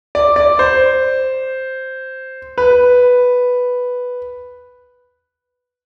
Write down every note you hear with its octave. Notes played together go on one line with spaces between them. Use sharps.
D5
D5
C5
B4